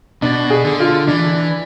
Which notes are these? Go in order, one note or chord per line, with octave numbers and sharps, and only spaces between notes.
B2 D4
G#4
D3
F4
E3 D4